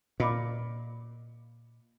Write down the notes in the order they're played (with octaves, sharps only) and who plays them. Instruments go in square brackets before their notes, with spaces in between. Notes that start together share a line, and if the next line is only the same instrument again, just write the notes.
[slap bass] A#2 [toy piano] D#5 B5 D6